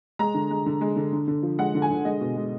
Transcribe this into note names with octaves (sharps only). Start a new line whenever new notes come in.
G#3 A#5
D3
G#3
D3
G#3
D3
D3
D3
F3
G#3 F#5
D3
G#5
D3
G#3 D#5
B2
G#3